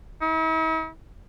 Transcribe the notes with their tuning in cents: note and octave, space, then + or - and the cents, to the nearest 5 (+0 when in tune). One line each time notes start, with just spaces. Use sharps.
E4 -45